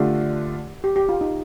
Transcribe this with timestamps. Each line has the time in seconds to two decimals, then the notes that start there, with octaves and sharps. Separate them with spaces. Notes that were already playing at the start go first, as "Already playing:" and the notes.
Already playing: D3 A3 D4 F4 G4
0.84 G4
0.96 G4
1.09 F4
1.21 D#4